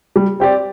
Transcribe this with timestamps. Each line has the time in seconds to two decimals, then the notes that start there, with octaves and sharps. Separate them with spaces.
0.16 G3
0.40 C4 G4 D5